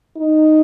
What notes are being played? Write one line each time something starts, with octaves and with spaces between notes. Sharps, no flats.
D#4